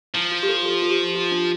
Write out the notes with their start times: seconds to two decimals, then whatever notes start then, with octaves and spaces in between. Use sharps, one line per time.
0.14 F3 E4
0.32 F4
0.43 G4
0.49 A4
0.65 A4
0.82 F4
0.90 G4
1.15 F4
1.32 D4